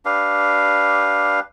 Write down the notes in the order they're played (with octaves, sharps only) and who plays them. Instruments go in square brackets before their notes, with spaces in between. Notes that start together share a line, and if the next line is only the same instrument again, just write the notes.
[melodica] D4 G4 B4 F5